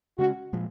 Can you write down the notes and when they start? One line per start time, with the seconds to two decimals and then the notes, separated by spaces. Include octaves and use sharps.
0.18 C#3 G#3 C#4 F#4
0.53 A#2 F3 G#3